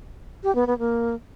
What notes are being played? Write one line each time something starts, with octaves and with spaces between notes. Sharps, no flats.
G4
B3
B3
A#3